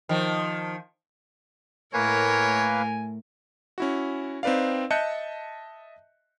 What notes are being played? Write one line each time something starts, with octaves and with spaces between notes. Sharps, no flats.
D#3 F3
A2 A3 A#3 A#4 B4 C#5 F5 G#5
C#4 E4 F#4
C4 D#4 B4 D5 F5
D#5 E5 A5 F#6 G6 C#7